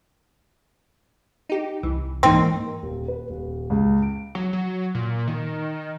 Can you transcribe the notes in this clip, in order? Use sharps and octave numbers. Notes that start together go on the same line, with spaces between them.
D#4 G4
C2 E3
G#2 E3 A#3 C4 D#4
A#4
D#1
B4
D#1
C#2
D7
F#3
F#3
A#2
D#3